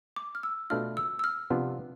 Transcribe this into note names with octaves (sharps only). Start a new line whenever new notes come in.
D6
F6
E6
B2 A3 D4 F4 F6
E6
E6
F6
C3 F3 B3 D4 F4